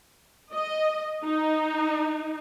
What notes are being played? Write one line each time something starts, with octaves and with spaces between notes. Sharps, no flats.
D#5
D#4